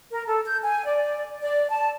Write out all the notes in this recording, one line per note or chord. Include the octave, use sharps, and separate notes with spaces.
A#4
A4
G6
G#5
D5
D5
A5